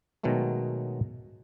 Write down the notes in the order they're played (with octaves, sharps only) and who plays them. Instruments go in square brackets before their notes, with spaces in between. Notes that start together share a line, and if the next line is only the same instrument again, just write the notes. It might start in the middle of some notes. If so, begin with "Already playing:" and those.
[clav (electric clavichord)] B2 D#3 F#3 G#3 A3